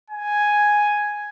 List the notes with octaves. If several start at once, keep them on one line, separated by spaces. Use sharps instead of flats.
G#5